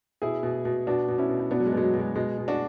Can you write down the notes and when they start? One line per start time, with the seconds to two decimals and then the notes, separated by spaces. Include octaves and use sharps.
0.22 B2 E4 G#4
0.43 B2
0.65 B2
0.87 B2 D4 F#4
1.08 B2
1.18 C#4 E4
1.29 B2
1.39 E4
1.50 B2 B3 D4
1.60 F#3
1.67 G#3
1.72 B2
1.77 G#3
1.83 F#3
1.94 B2
1.99 G#3
2.15 B2 G#3
2.38 B2
2.48 D4 F#4